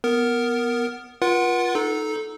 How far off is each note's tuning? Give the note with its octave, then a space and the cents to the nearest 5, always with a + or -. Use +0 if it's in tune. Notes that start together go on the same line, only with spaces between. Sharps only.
B3 +0 A#4 +0
F4 +0 B4 -45 F#5 +0
D#4 +0 A4 -15